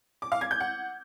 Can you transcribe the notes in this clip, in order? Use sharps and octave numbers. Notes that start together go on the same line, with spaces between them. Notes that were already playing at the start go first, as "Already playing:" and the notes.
D6
F5
G#6
G6
F#5